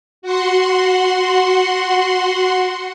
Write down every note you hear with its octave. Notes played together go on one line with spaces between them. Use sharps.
F#4 F#5 C6